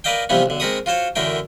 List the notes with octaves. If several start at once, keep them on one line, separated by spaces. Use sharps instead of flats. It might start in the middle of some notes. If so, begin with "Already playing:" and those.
A#4 B4 D5 D#5 F5 G5
C3 E3 F3 G3 B3 C#4
B1 D3
G#3 C4 A#4 B5 C#6 D#6
F4 F#4 C5 C#5
F#2 D3 E3 A3 A#4 G5